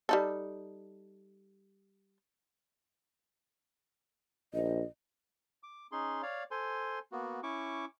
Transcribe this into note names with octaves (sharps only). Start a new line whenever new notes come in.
G3 D#4 A4
A#1 D#5
D6
C#4 D#4 G#4 C6
C#5 D5 F5
A4 C5 G#5 C6
A#3 B3 F#4
C#4 E4 C#6 D6